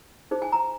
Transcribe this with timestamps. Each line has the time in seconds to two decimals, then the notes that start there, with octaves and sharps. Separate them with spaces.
0.31 D#4 G#4 C5
0.42 G#5
0.52 A#5